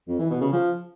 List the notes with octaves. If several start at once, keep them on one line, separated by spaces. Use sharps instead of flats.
F2
E3
B2
C#3
F3